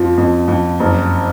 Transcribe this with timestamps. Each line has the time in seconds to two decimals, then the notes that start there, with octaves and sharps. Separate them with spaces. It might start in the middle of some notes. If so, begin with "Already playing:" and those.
Already playing: F2 F3
0.17 F2
0.48 F2
0.80 F#1